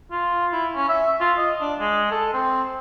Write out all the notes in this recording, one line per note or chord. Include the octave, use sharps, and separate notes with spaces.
F4
E4
C#4
E5
F4
D#5
D4
G#3
A4
C4